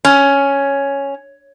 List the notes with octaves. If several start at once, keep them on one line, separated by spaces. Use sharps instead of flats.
C#4